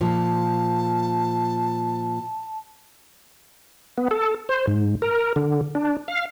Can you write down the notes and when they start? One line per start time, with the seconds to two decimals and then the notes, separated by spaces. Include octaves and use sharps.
0.01 A#2 F3 A5
3.98 B3
4.11 A4
4.49 C5
4.67 G#2
5.02 A#4
5.36 D3
5.75 D4
6.08 F5